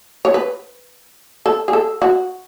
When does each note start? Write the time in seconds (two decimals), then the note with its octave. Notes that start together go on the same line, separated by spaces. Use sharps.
0.25 C#5
0.34 B4
1.46 A4
1.68 G#4
1.73 A4
2.02 F#4